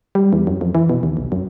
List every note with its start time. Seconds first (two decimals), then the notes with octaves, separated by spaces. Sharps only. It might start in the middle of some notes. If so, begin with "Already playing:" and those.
0.15 G3
0.33 E2
0.47 F#2
0.61 F2
0.75 E3
0.90 B2
1.03 D#2
1.17 B1
1.32 F#2